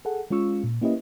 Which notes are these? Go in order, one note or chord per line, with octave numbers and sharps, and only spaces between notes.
G#4 A4 F#5
G#3 C#4 F4 C#6 E6
A#2
A#3 C#4 E4 G4 B4 D#5